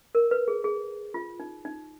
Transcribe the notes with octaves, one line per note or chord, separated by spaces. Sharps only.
A#4
B4
G#4
G#4
F4
D#4
D#4